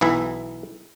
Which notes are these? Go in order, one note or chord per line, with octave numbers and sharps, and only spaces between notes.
B1 E3 E4 E5